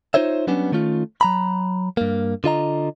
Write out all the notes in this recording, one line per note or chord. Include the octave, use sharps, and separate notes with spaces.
D#4 F4 C5 C#5 E5
F#3 G3 B3 C#4 D4
D#3 A3 C#4 F4
F#3 A#5 B5
G2 A#3
D3 F4 D#5 A#5